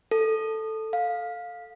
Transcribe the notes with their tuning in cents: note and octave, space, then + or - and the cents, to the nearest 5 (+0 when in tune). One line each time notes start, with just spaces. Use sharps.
A4 +0
F5 +15